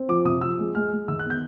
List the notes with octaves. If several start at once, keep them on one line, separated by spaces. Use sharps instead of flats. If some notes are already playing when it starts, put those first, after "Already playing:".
Already playing: C4
F3 D6
C3 D#6
F3 E6
G#3
G#3 F6
G#3
D#3 E6
F#6
B3 G6